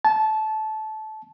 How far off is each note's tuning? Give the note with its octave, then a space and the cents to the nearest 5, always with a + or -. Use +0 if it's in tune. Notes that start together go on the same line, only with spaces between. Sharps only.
A5 -20